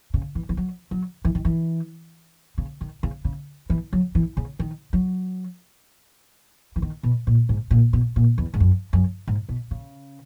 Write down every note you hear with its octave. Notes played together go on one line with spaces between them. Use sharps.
C#3
E3
E3
F#3
F#3
E3
D#3
E3
C#3
D#3
C#3
C#3
E3
F#3
E3
C#3
D#3
F#3
E3
D#3
B2
A#2
G#2
A#2
B2
A#2
E2
G#2
F#2
F#2
G#2
B2
C#3